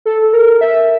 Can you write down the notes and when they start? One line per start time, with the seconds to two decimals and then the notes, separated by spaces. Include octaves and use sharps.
0.06 A4
0.33 A#4
0.61 E5